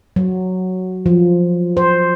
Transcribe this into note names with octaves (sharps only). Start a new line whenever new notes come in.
F#3
F3
C5